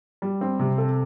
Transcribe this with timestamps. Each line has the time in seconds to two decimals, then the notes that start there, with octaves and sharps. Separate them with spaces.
0.22 G3
0.41 C4
0.60 C3
0.78 A4